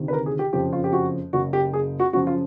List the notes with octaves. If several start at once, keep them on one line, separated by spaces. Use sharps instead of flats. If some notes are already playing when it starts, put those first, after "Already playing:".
Already playing: D2 C3 D#3
B4
A#4
G#4
G4
F#1 F2 C#3 F3 G4
F4
G4
F#4
F#1 F#2 C#3 F#4
G4
G#4
F#4
F#2 C#3 F3 F#4
F4